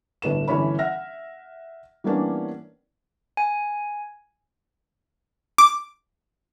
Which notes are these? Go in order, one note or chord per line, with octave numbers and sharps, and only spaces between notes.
G1 A2 B4 E7
G1 E3 C#4 C#5 B5
E5 F#5 F6 A#6
E3 G3 A#3 B3 C#4 D4
G#5
D6